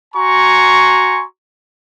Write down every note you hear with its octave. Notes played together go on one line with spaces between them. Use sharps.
F#4 G#5 A#5 C6 C#6